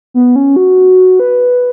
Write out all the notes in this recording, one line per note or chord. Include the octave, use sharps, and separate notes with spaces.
B3
C#4
F#4
B4